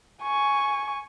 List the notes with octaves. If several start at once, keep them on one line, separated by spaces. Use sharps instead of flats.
G#5 C#6